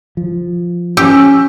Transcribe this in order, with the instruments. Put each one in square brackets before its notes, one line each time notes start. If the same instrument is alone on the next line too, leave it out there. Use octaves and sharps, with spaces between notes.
[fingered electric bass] F3
[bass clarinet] C#4 [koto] G4 [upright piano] E6